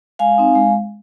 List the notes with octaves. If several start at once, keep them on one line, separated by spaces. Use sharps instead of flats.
G#3 F5 G#5
C4 D#4
G#3